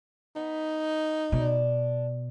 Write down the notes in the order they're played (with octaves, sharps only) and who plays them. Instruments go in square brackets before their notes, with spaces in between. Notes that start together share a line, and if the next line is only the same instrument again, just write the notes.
[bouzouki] B3 [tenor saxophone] D#4
[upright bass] B2 [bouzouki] D4